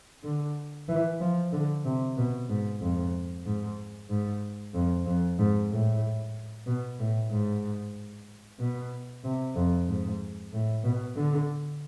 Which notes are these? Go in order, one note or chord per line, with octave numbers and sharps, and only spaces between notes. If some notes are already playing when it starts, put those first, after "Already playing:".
D3
E3
F3
D3
C3
B2
G#2
F2
G#2
G#2
F2
F2
G#2
A2
B2
A2
G#2
B2
C3
F2
G#2
A2
B2
D3